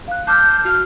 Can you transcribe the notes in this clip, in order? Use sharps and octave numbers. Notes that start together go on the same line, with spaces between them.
F5 F#6
A5 D6 F6 G6
F#4 F6